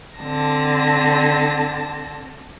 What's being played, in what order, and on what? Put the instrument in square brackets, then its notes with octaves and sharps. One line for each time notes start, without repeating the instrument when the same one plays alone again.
[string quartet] D3 C4 A5 A#6